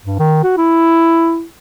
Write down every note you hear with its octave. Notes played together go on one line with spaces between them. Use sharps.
G2
D#3
F#4
E4